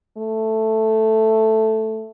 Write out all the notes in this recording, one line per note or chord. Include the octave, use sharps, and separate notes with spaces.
A3